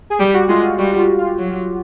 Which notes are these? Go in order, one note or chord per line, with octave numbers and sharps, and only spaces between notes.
G#4
G3 G4
F#4
G#3 F4
F4
G3 F#4
F4
F4
F#3